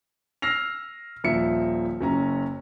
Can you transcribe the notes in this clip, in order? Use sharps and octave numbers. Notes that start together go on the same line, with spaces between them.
E6 F6 A#6 C7 F7
D#1 F3 E5 C#7
F#1 C#4 A#5